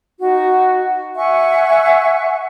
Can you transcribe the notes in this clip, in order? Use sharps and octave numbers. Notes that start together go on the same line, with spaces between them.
D#4 F#4
E5 F#5 G#5 C#6